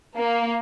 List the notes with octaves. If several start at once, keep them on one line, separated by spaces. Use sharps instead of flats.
A#3